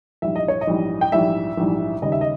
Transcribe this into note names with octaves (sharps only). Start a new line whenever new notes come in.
A#1 G#2 E3 G3 E5
D#5
C#5
D#5
A#1 G#2 E3 G3
G5
A#1 G#2 E3 G3 E5
A#1 G#2 E3 G3
D#2 C#3 G3 D#5
E5
D#5